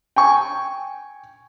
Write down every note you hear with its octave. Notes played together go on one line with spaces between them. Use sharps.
G5 G#5 C#6